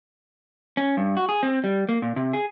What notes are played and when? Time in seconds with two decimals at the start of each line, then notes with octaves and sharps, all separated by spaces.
0.77 C#4
0.97 G2
1.17 F#4
1.29 G#4
1.43 C4
1.64 G3
1.89 A#3
2.02 A#2
2.16 C3
2.33 G#4